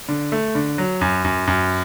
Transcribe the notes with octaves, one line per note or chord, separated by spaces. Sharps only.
D3
A3
D3
F#3
F#2
F#2
F#2